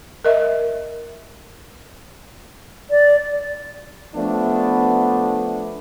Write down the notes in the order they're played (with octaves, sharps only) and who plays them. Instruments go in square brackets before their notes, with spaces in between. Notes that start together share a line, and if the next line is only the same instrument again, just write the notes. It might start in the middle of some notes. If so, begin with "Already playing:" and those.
[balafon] A#4 D#5 E5
[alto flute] D5
[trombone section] F3 A3 D4 [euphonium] B3